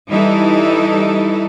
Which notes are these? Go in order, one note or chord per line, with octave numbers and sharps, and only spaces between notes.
E3 G3 D#4 E4 A4